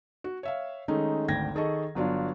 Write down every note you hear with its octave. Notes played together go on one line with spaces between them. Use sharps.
F#4
C#5 E5 F5
D#3 G#3 A3 C#4 D#4
G#1 D2 G5 G#6 A#6
D#3 G#4 A4 D#5 C#6
G1 F#3 D4 F4